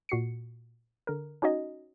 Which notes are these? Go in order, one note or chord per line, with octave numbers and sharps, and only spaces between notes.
A#2 F#4 C7 C#7
D3 A#4
C#4 D#4 F#4 C#5 D#5